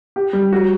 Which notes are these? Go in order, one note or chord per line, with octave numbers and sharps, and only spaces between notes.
G4
G3
F#4